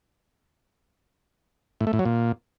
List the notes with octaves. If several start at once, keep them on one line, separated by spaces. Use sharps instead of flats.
A2
A3
A2
F#3
A#2